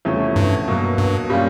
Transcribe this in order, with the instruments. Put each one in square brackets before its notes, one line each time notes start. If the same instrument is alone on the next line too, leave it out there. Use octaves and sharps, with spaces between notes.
[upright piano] E2 C3 F3 A3 C#4
[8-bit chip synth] G2
[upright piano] B2 F#3 A#3
[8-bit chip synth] G2
[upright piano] A#2 G3 A#3 C#4 F4